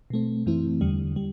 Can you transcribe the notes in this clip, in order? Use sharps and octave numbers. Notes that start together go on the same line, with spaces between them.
B2 A3 C4
F#2 E3 A3 C4 E4
E2 D3 G3
G3